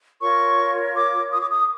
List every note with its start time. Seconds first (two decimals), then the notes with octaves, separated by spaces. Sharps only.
0.21 F4 A#4 C#5 C#6
0.95 D6
1.31 D#6
1.40 D6
1.49 D#6